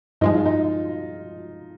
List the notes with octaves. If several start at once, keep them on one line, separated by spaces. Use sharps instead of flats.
G2 F3 G#3 D#4
F4
D#4